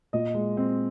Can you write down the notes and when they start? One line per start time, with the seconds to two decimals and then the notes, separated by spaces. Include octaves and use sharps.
0.13 A#2 D#5
0.35 G#3
0.57 C4